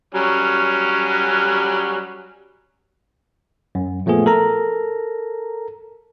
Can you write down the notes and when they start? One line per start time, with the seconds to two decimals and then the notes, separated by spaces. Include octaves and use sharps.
0.14 F#3 G3 C#4
3.75 F#2
4.06 A#2 F3 A3 B3 G#4
4.26 A4 A#4 A#5